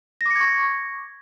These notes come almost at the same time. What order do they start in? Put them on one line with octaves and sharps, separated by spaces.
A#6 D6 C#7 G#6 C#6